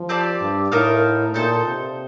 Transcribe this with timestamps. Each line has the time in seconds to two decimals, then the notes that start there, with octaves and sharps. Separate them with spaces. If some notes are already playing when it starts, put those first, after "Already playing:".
Already playing: F3
0.09 C4 G4 D5 A5
0.40 G2
0.72 A2 D#4 A#4 F5 A5
1.34 A#2 D#4 A4 C5
1.66 C3